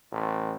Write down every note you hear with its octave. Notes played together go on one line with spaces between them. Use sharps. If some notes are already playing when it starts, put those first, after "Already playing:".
A1